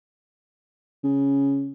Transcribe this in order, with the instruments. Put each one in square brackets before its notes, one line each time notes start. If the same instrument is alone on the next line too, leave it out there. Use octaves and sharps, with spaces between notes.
[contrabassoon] C#3